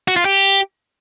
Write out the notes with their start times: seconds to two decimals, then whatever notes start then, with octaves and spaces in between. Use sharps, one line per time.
0.08 F#4
0.16 F4
0.25 G4